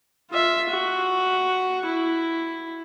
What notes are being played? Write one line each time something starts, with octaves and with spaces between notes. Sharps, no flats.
F4 E5
F#4
E4